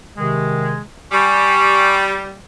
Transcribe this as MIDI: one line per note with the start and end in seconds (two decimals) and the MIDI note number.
0.17 0.78 48
0.17 0.78 51
0.17 0.78 56
1.12 2.37 55
1.12 2.02 80
1.12 2.02 85